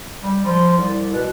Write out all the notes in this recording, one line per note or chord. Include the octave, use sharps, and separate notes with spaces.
G3
F3 C6
C2 D5
B2 B4